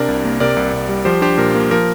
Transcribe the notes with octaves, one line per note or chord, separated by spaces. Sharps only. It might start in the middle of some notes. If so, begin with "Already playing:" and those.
Already playing: C3 D4 A#4 D5
C2
A#3
C3 A#4 D5
C2
C2
G3
F3 G4 C5
D4 G4 C5
A#2 A#4
A#3
F3 A#4